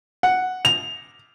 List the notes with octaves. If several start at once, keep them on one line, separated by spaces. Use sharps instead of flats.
F#5
F7